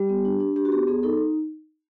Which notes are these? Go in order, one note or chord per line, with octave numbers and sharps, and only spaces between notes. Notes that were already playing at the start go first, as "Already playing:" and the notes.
Already playing: G3 G4
B3
D4
D4
D4 G4
F#4
B3 G4
B3 G#4
D#4 A4